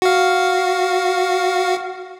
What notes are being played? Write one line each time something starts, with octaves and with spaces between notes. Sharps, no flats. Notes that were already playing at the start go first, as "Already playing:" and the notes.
F#4 F5